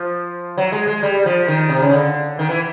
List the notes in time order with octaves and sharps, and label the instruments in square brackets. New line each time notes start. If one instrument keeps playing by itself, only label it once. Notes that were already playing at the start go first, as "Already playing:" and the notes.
Already playing: [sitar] F3
F#3
G#3
G#3
G3
F3
D#3
C3
C#3
D3
D#3
E3